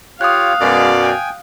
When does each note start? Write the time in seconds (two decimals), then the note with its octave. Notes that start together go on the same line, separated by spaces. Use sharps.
0.21 F4 G4 C#5 F5 D#6 F#6
0.61 F#2 B2 G#3 G#4 D5
1.02 G5 G#5